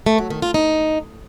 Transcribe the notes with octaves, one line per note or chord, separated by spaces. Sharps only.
A3
F#3
D#3
F4
D#4